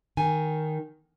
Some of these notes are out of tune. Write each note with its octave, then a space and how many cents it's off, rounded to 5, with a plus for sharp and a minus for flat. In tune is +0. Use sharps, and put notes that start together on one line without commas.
D#3 +0 G#5 +0